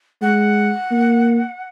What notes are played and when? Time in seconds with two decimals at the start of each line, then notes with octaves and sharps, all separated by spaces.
0.22 G#3 F#5
0.91 A#3